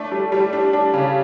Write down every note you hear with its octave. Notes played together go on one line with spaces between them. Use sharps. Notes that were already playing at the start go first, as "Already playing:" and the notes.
Already playing: A3 D4
G3
G3
D4
D4
C#3